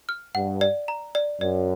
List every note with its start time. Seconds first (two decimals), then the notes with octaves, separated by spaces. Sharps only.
0.09 F6
0.35 G2 F#5
0.61 D5
0.88 A#5
1.15 D5
1.41 F#2 D5